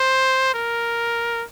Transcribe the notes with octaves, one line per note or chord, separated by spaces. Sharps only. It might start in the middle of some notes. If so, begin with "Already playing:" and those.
Already playing: C5
A#4